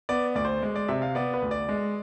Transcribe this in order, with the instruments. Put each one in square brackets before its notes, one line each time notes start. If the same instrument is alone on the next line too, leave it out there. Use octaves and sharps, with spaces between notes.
[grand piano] B3 D5
D2 D5
C5
G#3
D5
C3 E5
F5
B3 D5
B4
D2
D5
G#3